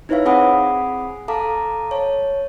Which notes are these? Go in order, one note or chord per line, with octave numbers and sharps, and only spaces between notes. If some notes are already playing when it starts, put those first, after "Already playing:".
D#4 E4 B4 C#5 E5 F5
C4 G#4 F#5 G#5 B5 D#6
A4 F5 A5 A#5 D6
C#5 A5